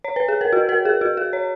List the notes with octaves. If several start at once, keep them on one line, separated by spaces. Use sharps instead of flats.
C#5
B4
G#4
A#4
F#4
A#4
G#4
F#4
G#4
C#5